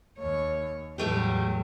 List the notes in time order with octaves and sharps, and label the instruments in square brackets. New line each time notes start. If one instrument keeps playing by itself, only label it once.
[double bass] D#2 [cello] C#5
[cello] E2 F#3 [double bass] A2 [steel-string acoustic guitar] G3 A3 G4